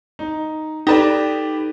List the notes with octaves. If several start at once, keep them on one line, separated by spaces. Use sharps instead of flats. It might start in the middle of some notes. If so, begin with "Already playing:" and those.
D#4
D#4 G4 A4 B4 D5